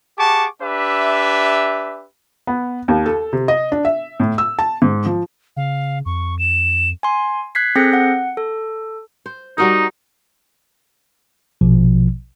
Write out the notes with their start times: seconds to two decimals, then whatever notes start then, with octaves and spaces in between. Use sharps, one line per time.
0.19 G4 G#4 F#5 A5 C#6 D6
0.62 D4 G4 B4 E5
2.47 B3
2.88 D#2
3.06 A4
3.33 C3
3.48 D#5
3.72 D4
3.85 E5
4.20 A2
4.38 E6
4.59 A5
4.82 G#2
5.06 F3
5.56 C#3 F5
6.06 F2 C#6
6.39 E7
7.03 G#5 C6
7.55 F#6 G#6 B6 C7
7.76 C4 G#4 A4 G6 A#6 C#7
7.93 F#5
8.37 A4
9.26 C5
9.58 G3 D#4 F#4 A#4
11.61 A#1 B2 F3